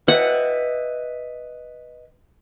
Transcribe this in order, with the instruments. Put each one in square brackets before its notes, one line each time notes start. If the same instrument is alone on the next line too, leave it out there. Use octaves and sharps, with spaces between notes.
[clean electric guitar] B4 D#5 E5 [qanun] F#5